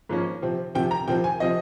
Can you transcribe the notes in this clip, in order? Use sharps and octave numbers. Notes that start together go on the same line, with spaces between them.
G#2 F3 A#3 C#4
C3 F3 C4
C3 F3 C4 G5
A#5
C3 F3 C4 G5
G#5
C3 F3 C4 D#5